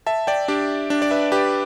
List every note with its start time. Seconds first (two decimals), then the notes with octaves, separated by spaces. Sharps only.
0.07 E5 A5
0.27 D5 G5
0.48 D4 G4
0.90 D4
1.02 D5
1.11 B4 E5
1.32 G4 B4